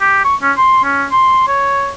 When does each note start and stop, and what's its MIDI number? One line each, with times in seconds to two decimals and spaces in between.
0.01 0.23 67
0.25 0.35 85
0.42 0.52 61
0.57 0.83 84
0.84 1.05 61
1.12 1.45 84
1.48 1.93 73